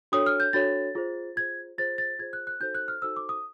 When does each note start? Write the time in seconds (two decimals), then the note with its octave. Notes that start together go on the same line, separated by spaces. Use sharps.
0.12 D4 F#4 A4 C#5 D#6
0.26 F6
0.40 G6
0.53 D4 F#4 A4 C#5 A6
0.95 F4 G#4 C5
1.36 F4 G#4 C5 G#6
1.78 F4 G#4 C5 A6
1.98 A6
2.19 F4 G#4 C5 G#6
2.33 F#6
2.47 F#6
2.60 D#4 F#4 A4 C5 G6
2.75 F#6
2.88 F6
3.02 D#4 F#4 A4 C5 E6
3.16 D6
3.29 D#6